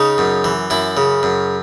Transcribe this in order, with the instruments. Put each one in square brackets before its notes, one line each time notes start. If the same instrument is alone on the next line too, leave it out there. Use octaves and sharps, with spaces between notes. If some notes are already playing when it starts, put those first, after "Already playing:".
Already playing: [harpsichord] C#3 D#4
F#2
E3
F#2 E4
C#3
F#2